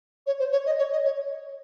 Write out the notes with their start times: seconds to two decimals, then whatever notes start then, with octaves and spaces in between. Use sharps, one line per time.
0.26 C#5
0.39 C5
0.52 C#5
0.66 D#5
0.78 C#5
0.92 D#5
1.05 C#5